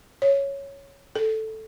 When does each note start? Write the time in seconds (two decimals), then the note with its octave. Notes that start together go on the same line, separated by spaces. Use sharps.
0.22 C#5
1.15 A4